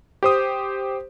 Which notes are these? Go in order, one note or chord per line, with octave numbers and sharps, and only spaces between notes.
G4 C5 D#6